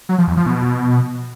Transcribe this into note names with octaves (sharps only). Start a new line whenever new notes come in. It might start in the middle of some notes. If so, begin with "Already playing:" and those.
F#3
F3
E2
F3
B2